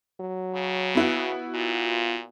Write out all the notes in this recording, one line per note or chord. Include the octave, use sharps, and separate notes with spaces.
F#3
C#3
B3 E4 F#4
A#2 F4